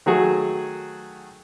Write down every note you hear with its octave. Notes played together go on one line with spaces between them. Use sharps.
D#3 F#3 A3 F#4 G#4